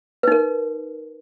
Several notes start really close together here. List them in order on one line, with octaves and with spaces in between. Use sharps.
B4 D#4 A#4